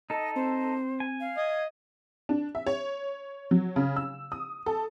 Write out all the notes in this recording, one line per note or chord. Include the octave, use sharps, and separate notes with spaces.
D#4 A4 D#5
C4 C5
G#5
F5
D#5 G#6
D4
E5
C#5
F#3
C#3
E6
D#6
A4